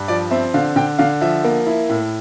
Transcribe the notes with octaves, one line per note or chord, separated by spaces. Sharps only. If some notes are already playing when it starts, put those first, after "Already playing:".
Already playing: G2
F3 D5
C4 E5
D3 F5
D3 G5
D3 F5
F3 E5
A#3
E4
A2